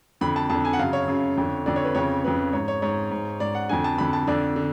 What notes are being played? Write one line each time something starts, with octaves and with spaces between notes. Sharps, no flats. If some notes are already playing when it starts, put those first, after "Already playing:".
F2 D3 B5
A5
F2 D3 A5
G#5
F#5
F#2 C#3 F5
C#5
F#2 C#3
F2 D3
F2 D3 D5
C#5
B4
F2 C#3 C#5
F2 C#3 B4
G#2 C#5
C#5
G#2 C#5
G#2
G#2 D5
F#5
F2 D3 G#5
A5
F2 D3 B5
A5
F2 D3 D5
D3